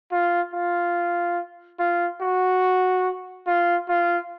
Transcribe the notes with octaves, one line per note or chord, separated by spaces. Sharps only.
F4
F4
F4
F#4
F4
F4